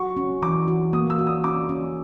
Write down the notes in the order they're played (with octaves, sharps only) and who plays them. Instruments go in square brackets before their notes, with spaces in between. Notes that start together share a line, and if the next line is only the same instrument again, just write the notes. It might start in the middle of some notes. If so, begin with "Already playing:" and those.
Already playing: [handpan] F#4 [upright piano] C#6
[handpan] C#4
[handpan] E3 [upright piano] D6
[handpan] F#4
[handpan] A#3 [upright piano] D#6
[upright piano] E6
[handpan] F#4
[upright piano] D#6
[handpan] C#4 [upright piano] D6
[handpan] C#4